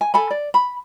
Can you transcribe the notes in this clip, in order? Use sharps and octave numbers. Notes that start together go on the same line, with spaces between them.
G#5
A4 G#5 B5
D5
B5